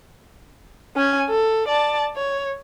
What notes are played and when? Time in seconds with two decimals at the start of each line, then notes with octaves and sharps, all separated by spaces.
0.96 C#4 G#5
1.30 A4
1.68 D5 A5
2.16 C#5